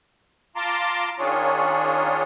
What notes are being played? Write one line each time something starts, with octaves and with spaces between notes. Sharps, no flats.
F4 A5 A#5 C6 D6
D#3 C#4 D4 F4 G#4 C#5